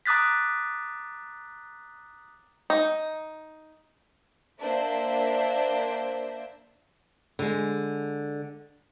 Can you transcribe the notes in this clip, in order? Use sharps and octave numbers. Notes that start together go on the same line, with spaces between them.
A#5 D6 D#6 F#6 A6 B6
D#4
A#3 D4 C5 E5
D3 G#3